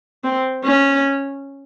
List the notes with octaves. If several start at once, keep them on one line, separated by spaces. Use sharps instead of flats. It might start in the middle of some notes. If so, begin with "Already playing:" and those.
C4
C#4